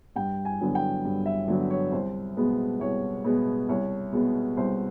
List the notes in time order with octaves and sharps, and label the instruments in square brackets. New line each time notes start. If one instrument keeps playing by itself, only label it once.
[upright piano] G2 G5
G#5
D3 F#3 B3
G5
G2
E5
D3 F#3 B3
C#5
C2 C5
B2 G#3 B3
C2 C#5
B2 G#3 B3
C2 C#5
B2 G#3 B3
C2 C5